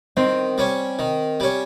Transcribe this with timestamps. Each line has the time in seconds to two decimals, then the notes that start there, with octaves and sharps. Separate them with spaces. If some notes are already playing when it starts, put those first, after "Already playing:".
0.17 D#3 C4
0.58 G3 C#4
0.99 D#3
1.40 G3 C#4